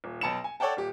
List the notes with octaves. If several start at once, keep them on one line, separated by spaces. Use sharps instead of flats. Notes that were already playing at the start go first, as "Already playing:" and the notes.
D#1
B1 A5 B5 C#7 E7
G#5
A4 C#5 D5 F#5 G5 A5
D#1 G4